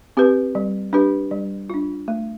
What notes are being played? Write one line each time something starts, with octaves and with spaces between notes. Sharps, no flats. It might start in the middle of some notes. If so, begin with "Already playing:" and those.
C4 G4 B4
G3
D4 G4 B4
G3
D4 F4
A3